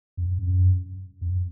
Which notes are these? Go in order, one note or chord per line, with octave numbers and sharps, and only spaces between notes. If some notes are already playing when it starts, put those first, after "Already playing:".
F2
F#2
F2